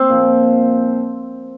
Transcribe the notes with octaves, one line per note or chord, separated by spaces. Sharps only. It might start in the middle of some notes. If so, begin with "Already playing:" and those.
Already playing: C4
A#2 F3